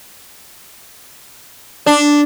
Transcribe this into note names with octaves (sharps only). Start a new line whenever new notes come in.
D4